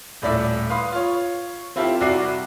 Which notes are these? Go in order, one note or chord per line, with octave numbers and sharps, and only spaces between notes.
D#1 A2 D5 E5
B4 F5 C6 D#6
F4 C#5
C4 E4 F4 G4 A4
C2 E4 F#4 D5 D6 C7